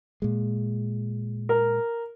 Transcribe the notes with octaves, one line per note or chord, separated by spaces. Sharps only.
A#2 G#3
A#4